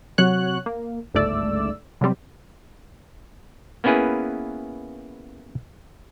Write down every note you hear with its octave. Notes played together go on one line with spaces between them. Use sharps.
C3 F#3 C#5 F#5 F#6
A#3
G1 C#2 G#2 A3 D5 E6
C3 F#3 G3 C4
A#3 B3 C#4 E4 G#4 B4